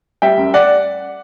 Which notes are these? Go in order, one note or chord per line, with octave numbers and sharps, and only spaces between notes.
G3 E5 G5
F#2
D5 F#5